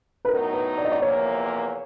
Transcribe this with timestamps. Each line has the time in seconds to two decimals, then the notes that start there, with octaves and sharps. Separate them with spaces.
0.25 B4
0.28 A2 F#3 B3 D#4 A#4
0.53 B4
0.78 D5
0.85 D#5
0.92 D5
1.02 E2 C3 F3 A#3 C#5